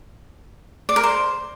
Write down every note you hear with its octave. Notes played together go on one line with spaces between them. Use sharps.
D5
A#4
C5